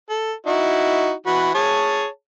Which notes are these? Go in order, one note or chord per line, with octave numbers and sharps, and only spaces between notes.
A4
D#4 E4 F#4
E3 F#4 B5
G#4 C#5 A5